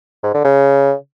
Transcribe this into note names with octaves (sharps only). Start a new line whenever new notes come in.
G#2
D3
C#3